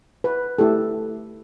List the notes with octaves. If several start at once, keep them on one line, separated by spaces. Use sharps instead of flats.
B4
A3 E4 G4 A4